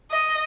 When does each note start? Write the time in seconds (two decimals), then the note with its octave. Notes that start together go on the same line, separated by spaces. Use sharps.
0.11 D#5